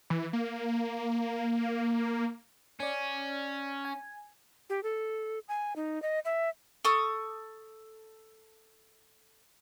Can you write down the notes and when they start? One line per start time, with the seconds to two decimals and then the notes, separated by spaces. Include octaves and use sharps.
0.10 E3
0.33 A#3
2.80 C#4 C#5 D5
3.85 G#5
4.70 G4
4.83 A4
5.48 G#5
5.76 D#4
6.02 D#5
6.25 E5
6.85 A4 C#6 D#6